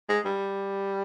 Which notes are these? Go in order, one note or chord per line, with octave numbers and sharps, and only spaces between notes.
G#3
G3